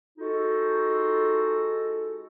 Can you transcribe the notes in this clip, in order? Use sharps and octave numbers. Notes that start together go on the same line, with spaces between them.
G#3 D#4 F4 F#4 A4